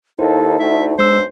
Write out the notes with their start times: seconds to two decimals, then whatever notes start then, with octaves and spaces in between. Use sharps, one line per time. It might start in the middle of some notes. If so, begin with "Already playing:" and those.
0.19 D#2 D#4 E4 A4 C5
0.60 D2 A3 E5
0.99 B1 G#3 D4 C5 E6